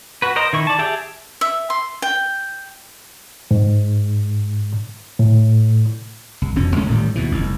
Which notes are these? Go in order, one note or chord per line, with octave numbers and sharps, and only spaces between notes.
F#4 B4
A#4 C5 D#5
D#3 E4 C#6
D5 A5
G4 G#4 E5 G5 A5
E5
C6
G5
G#2
A2
C2
E1 F2 B2 C#4
C#2 G#3 A3 C#4
A1 A2 D#3 G3
D#2 B2 E3
F1 C2